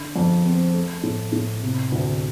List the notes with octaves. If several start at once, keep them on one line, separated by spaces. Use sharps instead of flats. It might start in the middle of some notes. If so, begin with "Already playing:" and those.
Already playing: D3
F2
C4
A3
A2
A2
C3
D2